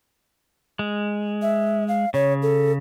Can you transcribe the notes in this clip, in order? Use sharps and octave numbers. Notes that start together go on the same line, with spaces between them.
G#3
E5
F5
C#3 C#5
A4